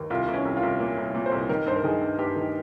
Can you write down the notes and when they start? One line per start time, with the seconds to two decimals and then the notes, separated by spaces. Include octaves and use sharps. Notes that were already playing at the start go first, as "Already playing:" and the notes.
Already playing: D#2
0.10 C2 F4
0.28 C2
0.34 C#4
0.45 C2
0.57 F4
0.63 C2
0.80 A#2
0.97 C2
1.15 A#2
1.26 C5
1.32 C2
1.49 D#3 A#4
1.66 G2 C5
1.76 A#4
1.84 D#3 G#4
2.01 G2
2.19 G2 G4
2.36 D#3